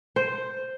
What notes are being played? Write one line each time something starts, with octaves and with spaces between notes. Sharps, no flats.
C5